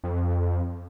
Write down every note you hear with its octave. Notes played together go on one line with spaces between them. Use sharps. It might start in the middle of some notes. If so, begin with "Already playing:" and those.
F2